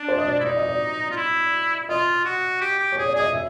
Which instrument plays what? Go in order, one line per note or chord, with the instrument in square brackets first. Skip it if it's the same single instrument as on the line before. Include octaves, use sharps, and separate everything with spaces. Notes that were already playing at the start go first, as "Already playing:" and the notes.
Already playing: [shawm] D4
[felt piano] C5
D#5
D5
[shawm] E4
[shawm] D#4 [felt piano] D5
[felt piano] D#5
D5
[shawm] F4
E4
[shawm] F4 [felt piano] D#5
[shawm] F#4
G4
G4
[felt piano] C#5
[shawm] G#4
[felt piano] D5
[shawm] G#4 [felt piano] D#5
[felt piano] E5